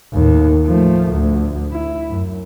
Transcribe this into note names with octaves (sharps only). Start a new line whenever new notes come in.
D#2 A2
F3 A3
D2
E4
F#2